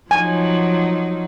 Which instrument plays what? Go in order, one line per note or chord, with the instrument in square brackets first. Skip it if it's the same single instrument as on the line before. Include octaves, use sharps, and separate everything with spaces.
[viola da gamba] F3 F#3 D#4 [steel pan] G#5